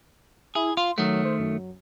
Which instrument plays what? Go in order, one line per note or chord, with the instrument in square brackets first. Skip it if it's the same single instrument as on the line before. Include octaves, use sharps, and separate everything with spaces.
[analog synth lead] E4 [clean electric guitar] G#4
[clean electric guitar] F4 [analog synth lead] C6
[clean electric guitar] D#3 A3 [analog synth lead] F#3
[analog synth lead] C5
F#2